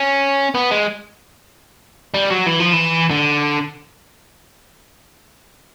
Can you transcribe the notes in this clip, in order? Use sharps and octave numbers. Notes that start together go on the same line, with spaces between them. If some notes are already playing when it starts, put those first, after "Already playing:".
Already playing: C#4
B3
G#3
G3
F#3
E3
F3
E3
D3